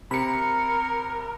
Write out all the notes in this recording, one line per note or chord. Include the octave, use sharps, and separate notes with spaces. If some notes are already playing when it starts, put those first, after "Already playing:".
C3 A#4 B5 C#7